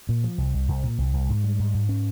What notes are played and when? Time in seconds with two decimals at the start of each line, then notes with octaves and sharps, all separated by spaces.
0.09 A#2
0.24 F3
0.38 C2
0.54 C2
0.68 C2
0.83 A#2
0.98 C2
1.13 C2
1.29 G#2
1.44 G3
1.59 G#2
1.74 G#2
1.89 C#4